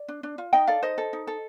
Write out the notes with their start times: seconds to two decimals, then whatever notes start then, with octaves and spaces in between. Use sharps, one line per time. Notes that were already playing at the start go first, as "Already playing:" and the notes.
Already playing: D5
0.08 D4
0.23 D4
0.38 F4
0.53 D#4 D#5 G5
0.67 A4 D5 F5
0.83 D#4 C5 D#5
0.98 A4
1.13 D#4
1.27 A4